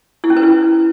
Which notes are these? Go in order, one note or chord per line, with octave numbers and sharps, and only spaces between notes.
E4
C#4
B4
E4